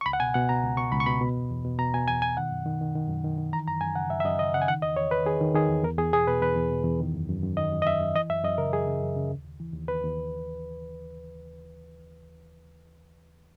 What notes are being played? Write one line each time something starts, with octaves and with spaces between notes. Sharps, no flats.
C#6
C#2 B5
F#5
B2 G#5
B2 F#5
B2 A#5
C#2
B2 C#6
C#2 B5
C#6
B2 B5
B2
E2
E2
B2
B2 A#5
B2 G#5
E2 G#5
B2 G#5
D#3 F#5
F#2
D#3
D#3
D#3
F#2
D#3
D#3
E3 A#5
F#2 A#5
F#2 G#5
C#3 F#5
F#2 E5
E5
F#2 D#5
C#3 D#5
C#3 F#5
G#5
D#3 F#5
E2 D#5
E2 C#5
E2 B4
D#3 G#4
D#3
D#3 G#4
E2
E2 A#4
E2 G#4
B2 G#4
B2 B4
E2 B4
E2
B2
E2
D#3
F#2
F#2
F#2
D#3 D#5
F#2
D#5
F#2 E5
F#2
E3 D#5
F#2 E5
F#2 D#5
C#3 A#4
F#2 G#4
C#3
F#2
C#3
D#2
D#2
E3
D#2
D#2 B4
D#2